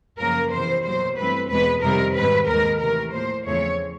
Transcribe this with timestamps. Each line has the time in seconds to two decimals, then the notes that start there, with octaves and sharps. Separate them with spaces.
0.20 F#2 C#3 F3 A#3 A#4
0.53 E2 C3 E3 C5
0.85 B2 F#3 A#3 C5
1.18 G2 E3 A3 C4 B4
1.51 E2 B2 G#3 B3 B4
1.83 F2 C3 D#3 G3 A#4
2.16 G#2 D#3 G3 C4 B4
2.49 D#2 D#3 G#3 A#4
2.81 C3 E3 A3 A#4
3.14 A2 F3 A#3 C5
3.47 E2 C#3 F3 A3 C4 C#5